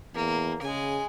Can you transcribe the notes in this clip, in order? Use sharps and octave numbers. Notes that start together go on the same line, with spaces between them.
E2 A#3
C#3 G#3 G#5